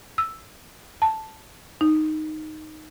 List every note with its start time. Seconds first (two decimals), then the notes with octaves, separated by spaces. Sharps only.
0.18 E6
1.02 A5
1.81 D#4